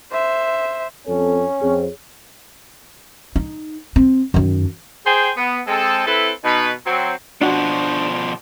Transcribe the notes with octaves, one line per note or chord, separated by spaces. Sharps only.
C5 E5
F2 C4 C#4 A4
F2 C4 G#4 C#5
D#4
C4
F#2 D#3
G#4 C5 G5
B3
G#3 C4 A4
C4 E4 A4 B4
B2 D#4 B4
F#3 C4
B2 F3 D4 F#4